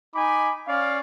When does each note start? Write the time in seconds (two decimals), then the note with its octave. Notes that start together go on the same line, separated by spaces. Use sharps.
0.14 D#4 G#5 B5 D6
0.67 C#4 D5 F5